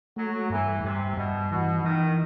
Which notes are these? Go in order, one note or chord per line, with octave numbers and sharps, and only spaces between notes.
F#3 A3
G2 E3
G2 C3
G2 B2
B2 E3
D#3 E3